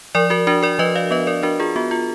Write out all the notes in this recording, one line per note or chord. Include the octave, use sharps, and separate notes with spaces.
F3 A#4 D5
F#4 A#4
D4 F#4 A#4
A#4 D5
F3 B4 D#5
D5 F5
B3 B4 D#5
A#4 D5
D4 F#4 A#4
F4 G#4
B3 F#4
F4